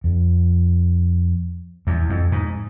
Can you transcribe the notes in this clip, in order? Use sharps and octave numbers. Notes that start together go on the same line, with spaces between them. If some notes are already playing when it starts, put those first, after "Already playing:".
F2
E2
F2
G#2